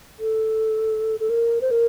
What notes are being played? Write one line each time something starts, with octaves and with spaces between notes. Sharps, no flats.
A4
A4
A#4
C5
A#4